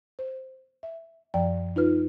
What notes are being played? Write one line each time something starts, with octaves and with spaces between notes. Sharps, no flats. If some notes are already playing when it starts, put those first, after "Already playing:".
C5
E5
F#2 F3 D5 G5
D#4 F4 B4 F6